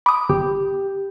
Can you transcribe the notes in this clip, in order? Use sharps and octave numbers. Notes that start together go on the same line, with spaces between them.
B5 D6 D#6
G1 G4